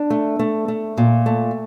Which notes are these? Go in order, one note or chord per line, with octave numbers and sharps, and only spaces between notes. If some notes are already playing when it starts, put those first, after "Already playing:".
Already playing: D4
A3
A3
A3
A#2
A3